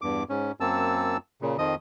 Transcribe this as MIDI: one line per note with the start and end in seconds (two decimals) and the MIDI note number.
0.02 0.23 40
0.02 0.23 43
0.02 0.23 86
0.29 0.52 44
0.29 0.52 61
0.60 1.17 42
0.60 1.17 58
0.60 1.17 60
0.60 1.17 81
0.60 1.17 88
1.42 1.57 46
1.42 1.57 49
1.58 1.75 41
1.58 1.75 51
1.58 1.75 53
1.58 1.75 75
1.58 1.75 87